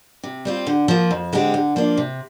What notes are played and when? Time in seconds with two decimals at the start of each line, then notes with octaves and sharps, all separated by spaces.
0.24 C3
0.45 G3 C4 F4
0.67 D3
0.88 F3 A#3
1.11 F2
1.33 D3 G#3 C4 G4
1.54 D3
1.76 F3 A#3 D4
1.98 C3